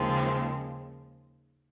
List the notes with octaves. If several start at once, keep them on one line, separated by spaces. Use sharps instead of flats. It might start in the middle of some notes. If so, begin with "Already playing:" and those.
Already playing: D#2 C#3 F3 G#3 C4